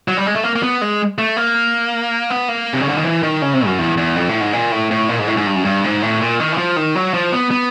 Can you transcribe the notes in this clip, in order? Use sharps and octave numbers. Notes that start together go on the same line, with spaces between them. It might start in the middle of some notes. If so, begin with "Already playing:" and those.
F#3
G3
G#3
A3
A#3
A#3
B3
G#3
A3
A#3
B3
A#3
C3
C#3
D3
D#3
E3
D#3
C#3
C3
F#2
E2
E2
F2
A2
G#2
A#2
A2
A2
A#2
G#2
A2
G#2
G2
F#2
G2
G#2
A2
A#2
D#3
E3
F3
D#3
F#3
F3
B3
B3